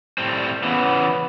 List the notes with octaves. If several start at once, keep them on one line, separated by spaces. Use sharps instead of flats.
A2 G3 C4
C#3 E3 B3